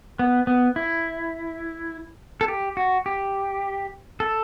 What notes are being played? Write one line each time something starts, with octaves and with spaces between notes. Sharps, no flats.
B3
B3
E4
A4
G4
F#4
G4
A4